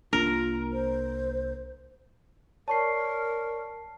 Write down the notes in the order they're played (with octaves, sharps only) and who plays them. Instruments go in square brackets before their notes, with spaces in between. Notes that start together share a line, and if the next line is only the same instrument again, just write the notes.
[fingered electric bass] C2 A#3 D4 [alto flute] F4 [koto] A#4
[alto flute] C5
[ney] A#4 [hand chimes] C#5 D5 C#6 [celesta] A5 C7